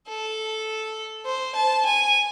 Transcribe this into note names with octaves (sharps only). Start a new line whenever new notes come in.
A4
C5
A5
G#5